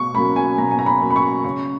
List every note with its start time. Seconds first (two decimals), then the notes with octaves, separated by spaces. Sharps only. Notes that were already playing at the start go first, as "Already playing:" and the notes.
Already playing: B2 C#6
0.14 F#3 A#3 C#4 B5
0.36 G#5
0.58 B2 A#5
0.71 G#5
0.79 A#5
0.86 B5
1.00 F#3 A#3 C#4
1.11 B5
1.16 C#6
1.44 C#3 C#6